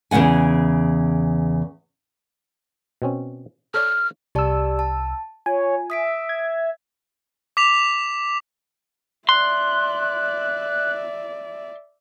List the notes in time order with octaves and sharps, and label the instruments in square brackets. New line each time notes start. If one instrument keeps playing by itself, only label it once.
[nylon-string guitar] E2 C#3 G#3 F#5 G#5
[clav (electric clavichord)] B2 C4 C#4
[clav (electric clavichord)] A4 C#5 D5 [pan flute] F6
[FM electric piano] C2 E6 [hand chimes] G4 D5 A5
[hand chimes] A5
[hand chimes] F4 [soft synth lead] C#5 [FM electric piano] G#5
[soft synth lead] E5 [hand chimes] D#6 B6 D7
[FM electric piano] G#6
[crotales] D6 B6 F7
[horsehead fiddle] D5 E5 [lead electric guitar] C6 [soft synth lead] F#6